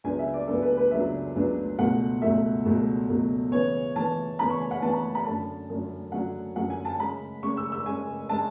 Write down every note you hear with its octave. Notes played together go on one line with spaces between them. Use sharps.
C#2 C#3 F#3 B3 D4 G#5
E5
D5
C#2 C#3 F#3 B3 D4 A4
B4
B4
C#2 C#3 F#3 B3 D4 E5
C#2 C#3 F#3 B3 D4
C#2 B2 F#3 A3 F#5
C#2 B2 F#3 A3 E5
C#2 B2 F#3 A3
C#2 B2 F#3 A3
C#3 E3 B3 C#5
C#3 E3 B3 A5
C#3 E3 B3 B5
C#6
G#5
F#5
C#3 E3 B3 A5
B5
B5
F#2 D3 F#3 C#4 A5
F#2 D3 F#3 C#4
F#2 D3 F#3 C#4 F#5
F#2 D3 F#3 C#4 F#5
G#5
A5
C#3 G#3 C#4 B5
C#3 G#3 C#4 C#6
E6
E6
C#3 G#3 C#4 G#5
C#3 G#3 C#4 A5